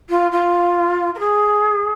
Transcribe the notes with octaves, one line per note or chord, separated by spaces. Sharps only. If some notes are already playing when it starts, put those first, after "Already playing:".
F4
F4
A#4
G#4